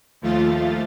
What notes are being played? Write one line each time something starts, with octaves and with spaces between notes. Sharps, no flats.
D#2 F3 A3 F4 A6